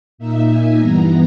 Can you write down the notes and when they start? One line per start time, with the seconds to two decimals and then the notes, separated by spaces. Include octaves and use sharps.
0.18 A#2 A#3 D#4 E5
0.49 G#5
0.78 G2 E3 G3 B3 A#5